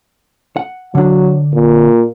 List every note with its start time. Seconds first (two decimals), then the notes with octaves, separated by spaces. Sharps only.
0.57 F#5
0.95 D3 F#3 D4
1.54 A#2